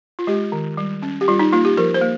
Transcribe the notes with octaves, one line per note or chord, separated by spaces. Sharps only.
F4
G#3 G4
D#3
G3
C#4
G4
G3 F4
D#4
A#3 F4
G4
F3 A#4
C5
A#3